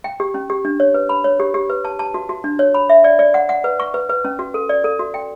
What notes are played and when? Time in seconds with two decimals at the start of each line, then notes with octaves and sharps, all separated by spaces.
0.04 G5
0.20 G4
0.34 C#4
0.50 G4
0.65 D4
0.80 C#5
0.94 B4
1.09 B5
1.24 C#5
1.40 G4
1.54 G4
1.70 B4
1.85 A5
1.99 A5
2.14 F#4
2.29 F#4
2.44 D4
2.59 C#5
2.74 B5
2.89 E5
3.04 D5
3.19 D5
3.34 F#5
3.49 F#5
3.64 B4
3.80 C#6
3.94 B4
4.09 B4
4.25 C#4
4.39 F#4
4.54 A4
4.69 D5
4.84 A4
4.99 F#4
5.14 G5